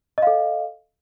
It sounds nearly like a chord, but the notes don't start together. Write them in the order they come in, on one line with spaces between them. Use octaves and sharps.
D#5 F5 A4